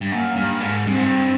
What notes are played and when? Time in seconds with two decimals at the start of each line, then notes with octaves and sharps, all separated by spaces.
0.01 G2
0.11 F#2 A#3
0.36 G2
0.61 G#2
0.86 G2 C4
0.95 G#2
1.04 G2